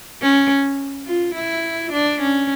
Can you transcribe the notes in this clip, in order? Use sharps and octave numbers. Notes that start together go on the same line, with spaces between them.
C#4
F4
E4
D4
C#4